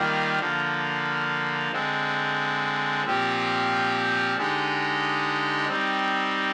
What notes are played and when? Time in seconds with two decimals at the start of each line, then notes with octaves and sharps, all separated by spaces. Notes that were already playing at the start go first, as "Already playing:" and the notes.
Already playing: D#3 G3 A#3 F4
0.39 D3 F3 A#3
1.72 D3 G#3 C4
3.04 A#2 F3 C4 G4
4.36 D3 G#3 D#4 G4
5.68 G3 C4 D#4